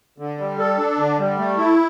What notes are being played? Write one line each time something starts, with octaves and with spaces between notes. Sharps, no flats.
D3
G3
A4
D4
D3
G3
A3
E4